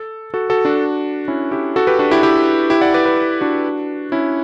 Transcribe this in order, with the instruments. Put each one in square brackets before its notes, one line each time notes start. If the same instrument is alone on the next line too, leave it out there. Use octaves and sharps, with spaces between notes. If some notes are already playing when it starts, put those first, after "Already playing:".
Already playing: [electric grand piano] A4
F#4 A4
F#4 A4
D4 F#4
C#4 E4
E4 G4
F#4 A4
G4 B4
D4 F#4
E4 G4
E4 G4
E4 G4
D5 F#5
B4 D5
G4 B4
D4 F#4
C#4 E4